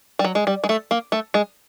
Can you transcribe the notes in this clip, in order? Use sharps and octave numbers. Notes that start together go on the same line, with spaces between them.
G3
F#3
G#3
G3
G#3
A3
A#3
A3
G#3